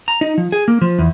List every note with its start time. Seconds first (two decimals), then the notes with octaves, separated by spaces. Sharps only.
0.08 A#5
0.21 D#4
0.38 F3
0.52 G#4
0.68 A#3
0.81 F3
0.99 E2